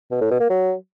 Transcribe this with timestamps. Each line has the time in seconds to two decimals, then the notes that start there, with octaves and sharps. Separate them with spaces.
0.11 B2
0.21 A2
0.30 B2
0.40 A#3
0.50 F#3